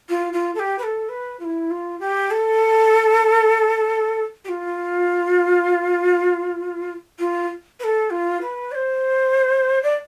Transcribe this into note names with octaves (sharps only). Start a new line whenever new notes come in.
F4
F4
A4
G4
B4
A4
B4
F4
E4
F4
G4
A4
G4
F4
F4
B4
A4
F4
B4
D5
C5
D5